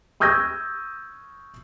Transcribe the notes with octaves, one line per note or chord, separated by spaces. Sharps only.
C#6 D#6 E6 G6 G#6 A#6